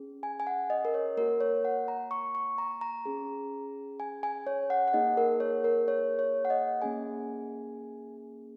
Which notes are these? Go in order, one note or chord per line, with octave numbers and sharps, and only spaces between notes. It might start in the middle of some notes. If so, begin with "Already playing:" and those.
Already playing: C#4 G#4
G#5
G#5
F#5
D#5
A#4
C#5
A#3 F#4 A#4
C#5
F#5
A#5
C#6
C#6
A#5
A#5
C#4 G#4
G#5
G#5
C#5
F#5
F#5
A#3 D#4 G#4 D#5
A#4
C#5
A#4
C#5
C#5
F#5
D#5
A#3 C#4 G#4 G#5